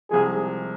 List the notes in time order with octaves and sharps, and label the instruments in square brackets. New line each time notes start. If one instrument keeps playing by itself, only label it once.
[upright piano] C2 C3 F3 G#3 [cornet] G#4